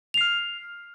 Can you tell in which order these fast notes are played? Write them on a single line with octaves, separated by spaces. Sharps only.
F7 C7 F6